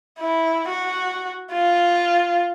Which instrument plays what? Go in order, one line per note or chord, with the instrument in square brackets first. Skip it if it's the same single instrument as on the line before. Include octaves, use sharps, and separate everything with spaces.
[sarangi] E4
F#4
F4